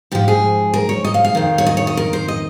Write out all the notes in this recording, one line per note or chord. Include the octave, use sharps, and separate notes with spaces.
G#2 F3 G4
G#4
A#4
C#5
D#5
F5
F5
F2 D#3
C#5
D#5
C#5
D#5
A#4
C5
D#5